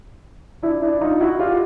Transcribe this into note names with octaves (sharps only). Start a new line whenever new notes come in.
D4 E4
D4 E4
D#4 F4
E4 F#4
F4 G4